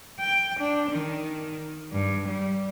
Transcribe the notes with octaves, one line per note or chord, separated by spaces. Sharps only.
G5
D4
D#3
G2
G3